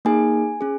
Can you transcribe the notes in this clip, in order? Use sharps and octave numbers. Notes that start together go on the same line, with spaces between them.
A#3 D#4 G#4 G#5
C#4 G#4